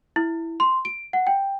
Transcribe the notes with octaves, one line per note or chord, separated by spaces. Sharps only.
E4
C6
D7
F#5
G5